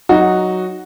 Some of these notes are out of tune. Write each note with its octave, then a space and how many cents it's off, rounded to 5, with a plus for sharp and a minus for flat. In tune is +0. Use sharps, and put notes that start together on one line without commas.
F#3 +0 D#4 +0 F#4 +0